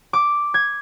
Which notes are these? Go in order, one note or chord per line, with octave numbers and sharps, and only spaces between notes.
D6
G#6